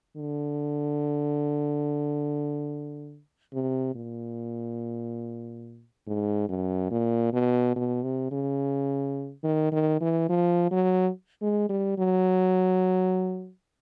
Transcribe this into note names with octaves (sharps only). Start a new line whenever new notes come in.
D3
C3
A#2
G#2
F#2
A#2
B2
B2
C3
C#3
D#3
D#3
E3
F3
F#3
G#3
G3
F#3